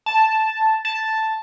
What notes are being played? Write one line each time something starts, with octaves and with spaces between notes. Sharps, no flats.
A5
A5